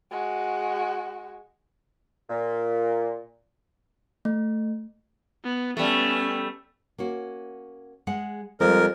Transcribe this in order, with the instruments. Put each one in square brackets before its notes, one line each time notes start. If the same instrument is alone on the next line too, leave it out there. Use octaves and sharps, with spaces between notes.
[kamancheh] G#3 F#4
[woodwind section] A#2
[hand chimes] A3
[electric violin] B3
[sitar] G3 A3 [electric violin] B3 C#4
[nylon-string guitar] A#3 C#4 F#4
G#3 G#4 F#5
[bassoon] F2 [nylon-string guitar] F3 G3 G#3 [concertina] A#4